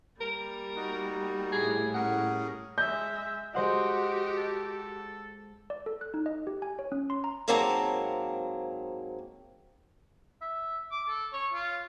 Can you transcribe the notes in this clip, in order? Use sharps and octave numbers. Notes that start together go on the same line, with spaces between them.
G3 A#3 A#4
D#4 F#4
A2 G#4
C#4 G#4 A#4 F#5
G#3 E5 G6
G#3 F#4 G4 C5 D#5 F#5
A4
D5
A4
F#6
D#4
D#5
G4
G#5
C#5
C#4
C6
A#5
G#2 F#3 A#3 C4 A5 A#5
E5
D6
A4
C#5
F4